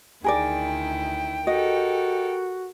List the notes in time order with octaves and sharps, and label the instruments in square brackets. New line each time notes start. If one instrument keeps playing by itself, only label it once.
[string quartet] D2 D#3 E4 [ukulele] G#4 A#4 D5 [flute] G5
[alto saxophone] F#4 [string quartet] G4 A4 A#4 [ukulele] D#5